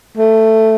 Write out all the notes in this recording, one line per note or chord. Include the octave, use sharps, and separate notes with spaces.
A3